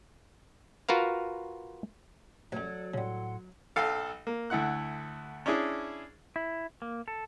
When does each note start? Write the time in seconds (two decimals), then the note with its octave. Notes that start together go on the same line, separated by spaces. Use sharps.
0.89 F4 F#4 A#4 B4 F5
2.52 A1 F#2 F#3 A4 D5
2.94 A2 C#3 G3 A4 F#5 C6
3.76 B1 A4 F5
4.27 A#3
4.50 D2 A3 E4 F#5 F#6
5.46 C#4 D4 E4 G#4
6.36 E4
6.82 A#3
7.08 A4